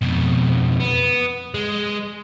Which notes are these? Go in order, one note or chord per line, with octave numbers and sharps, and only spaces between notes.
F2 B2
B3
G#3